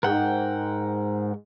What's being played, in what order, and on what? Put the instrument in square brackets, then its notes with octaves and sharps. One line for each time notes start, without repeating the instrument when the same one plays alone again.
[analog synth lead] G#2 [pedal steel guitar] A#4 F#5 G5